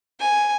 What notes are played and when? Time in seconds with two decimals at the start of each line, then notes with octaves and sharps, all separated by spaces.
0.20 G#5